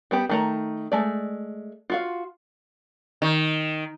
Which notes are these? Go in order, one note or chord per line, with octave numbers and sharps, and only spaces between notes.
G3 B3 G4
D#3 A3 A#5
G#3 A3 D5
F4 F#4 F5
D#3